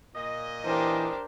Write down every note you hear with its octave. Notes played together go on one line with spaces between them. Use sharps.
A#2 D#5
E3 D4 G4 A#4 C5